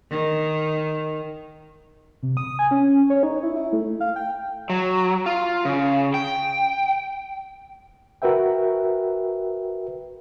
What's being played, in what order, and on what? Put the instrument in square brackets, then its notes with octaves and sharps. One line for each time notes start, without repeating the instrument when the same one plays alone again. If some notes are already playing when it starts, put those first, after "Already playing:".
[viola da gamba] D#3
[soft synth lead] C3
D#6
G#5
C#4
C#5
D#4
E4
E4
A3
F5
G5
[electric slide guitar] F#3
F4
C#3
G5
[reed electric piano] F#4 A#4 B4 E5 G5